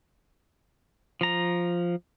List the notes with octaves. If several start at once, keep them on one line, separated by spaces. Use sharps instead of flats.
F3 A#5